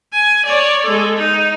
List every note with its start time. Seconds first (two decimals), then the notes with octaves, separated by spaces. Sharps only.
0.13 G#5
0.45 C#5 D5
0.84 G#3 A4
1.17 D#4